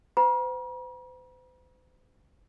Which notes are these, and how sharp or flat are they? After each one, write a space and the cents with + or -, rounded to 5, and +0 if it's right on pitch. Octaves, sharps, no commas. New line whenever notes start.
C5 -45 F#5 +30 A#5 +45